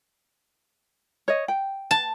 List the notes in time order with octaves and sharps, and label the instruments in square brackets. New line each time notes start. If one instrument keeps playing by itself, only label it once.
[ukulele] C#5 D#5
G5
[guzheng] A5